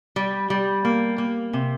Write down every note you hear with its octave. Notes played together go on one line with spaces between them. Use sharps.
G3
G3
A#3
A#3
C3